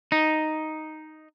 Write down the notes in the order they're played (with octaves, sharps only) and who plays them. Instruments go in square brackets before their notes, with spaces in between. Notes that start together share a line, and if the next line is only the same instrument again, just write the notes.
[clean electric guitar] D#4